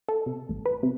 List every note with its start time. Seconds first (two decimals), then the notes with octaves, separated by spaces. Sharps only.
0.08 A4
0.26 C3
0.49 A1
0.66 B4
0.83 C3